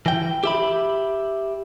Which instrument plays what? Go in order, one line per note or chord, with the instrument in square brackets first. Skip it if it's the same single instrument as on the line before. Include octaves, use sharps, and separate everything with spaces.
[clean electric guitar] E3 G5
G4 E5 B5